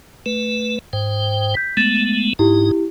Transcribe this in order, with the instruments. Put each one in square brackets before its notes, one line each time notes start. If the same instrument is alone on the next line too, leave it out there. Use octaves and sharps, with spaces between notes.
[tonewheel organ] A3 B4
G#2 C5 G5
[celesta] G6 B6
[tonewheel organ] G#3 A3 B3 [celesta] A6 E7
[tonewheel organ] G#2 D#4 [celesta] E4 G4